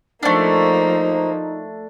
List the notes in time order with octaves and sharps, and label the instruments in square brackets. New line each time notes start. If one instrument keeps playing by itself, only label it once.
[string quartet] F3 A#3 [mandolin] A3 D4 [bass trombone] D#4 [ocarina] C5